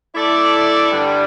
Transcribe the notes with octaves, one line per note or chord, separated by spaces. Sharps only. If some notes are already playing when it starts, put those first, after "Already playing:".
A3 E4 A4 D5
G2 D3 G3